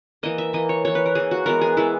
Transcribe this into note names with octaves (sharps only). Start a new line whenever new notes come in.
E3 A#3 D#5
E5
E3 A#3 D#5
C#5
E3 A#3 C#5
B4
A#4
E3 A#3 G#4
F#4
E3 G#3 B3 A#4
G#4
E3 G#3 B3 E4